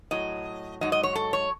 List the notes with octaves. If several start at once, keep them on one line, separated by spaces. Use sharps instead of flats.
A2 F#3 D#5
G#2 F#3 D#5
D#5
C#5
A4
C#5